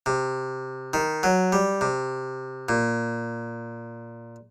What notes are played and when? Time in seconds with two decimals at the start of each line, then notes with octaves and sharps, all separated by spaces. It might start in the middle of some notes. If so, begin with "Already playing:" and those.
0.06 C3
0.94 D#3
1.23 F#3
1.53 G3
1.81 C3
2.69 A#2